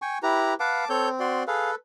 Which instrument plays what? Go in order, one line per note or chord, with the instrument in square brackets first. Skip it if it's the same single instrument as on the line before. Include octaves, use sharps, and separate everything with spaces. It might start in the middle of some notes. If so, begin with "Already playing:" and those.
[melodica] G5 G#5 C#6
[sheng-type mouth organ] E4 G4 A#5 [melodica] B4
[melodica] B4 F5 F#5 [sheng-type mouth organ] A5 D6
[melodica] C4 [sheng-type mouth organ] A4 C#5 G6
[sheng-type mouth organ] F#4 D5 C6
[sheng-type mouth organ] G#4 F5 [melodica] A4 B4